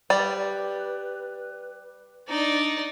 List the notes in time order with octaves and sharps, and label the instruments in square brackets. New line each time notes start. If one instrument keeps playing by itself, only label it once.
[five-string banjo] G3 D5 [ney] B4
[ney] D4 [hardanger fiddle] D#4 D5